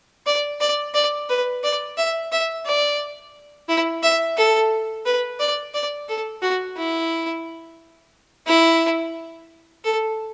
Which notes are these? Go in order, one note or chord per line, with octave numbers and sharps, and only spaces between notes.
D5
D5
D5
B4
D5
E5
E5
D5
E4
E5
A4
B4
D5
D5
A4
F#4
E4
E4
A4